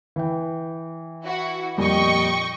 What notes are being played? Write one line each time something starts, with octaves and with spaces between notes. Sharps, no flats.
E3 G5
E4 F#4
F2 A#2 G3 D#5 G5 C#6